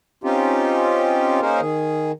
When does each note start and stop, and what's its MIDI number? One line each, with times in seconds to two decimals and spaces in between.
0.24 1.41 60
0.24 1.41 61
0.24 1.41 63
0.24 1.41 65
0.24 1.41 67
1.41 1.61 58
1.41 1.61 61
1.41 1.61 63
1.41 1.61 68
1.41 1.61 70
1.41 1.61 72
1.61 2.12 51
1.61 2.12 68